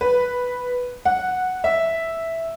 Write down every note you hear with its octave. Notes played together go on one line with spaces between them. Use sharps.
B4
F#5
E5